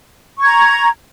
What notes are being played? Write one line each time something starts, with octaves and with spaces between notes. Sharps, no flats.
A#5 C#6 G#6